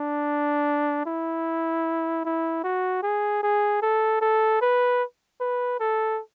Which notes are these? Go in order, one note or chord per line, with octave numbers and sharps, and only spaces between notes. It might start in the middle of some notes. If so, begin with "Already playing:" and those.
Already playing: D4
E4
E4
F#4
G#4
G#4
A4
A4
B4
B4
A4